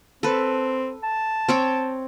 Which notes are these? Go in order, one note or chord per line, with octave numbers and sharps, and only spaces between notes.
C4 A4 B4
A5
C4 C#5 G5